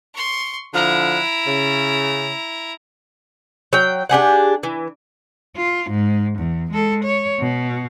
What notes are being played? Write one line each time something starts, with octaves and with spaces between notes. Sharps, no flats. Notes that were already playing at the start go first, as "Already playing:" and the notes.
C6 C#6
D3 F3 E4 F#5 A#5
C#3
F#3 G5
D4 G4 G#4 F#5
E3
F4
G#2
E2
G#3 A4
C#5
B2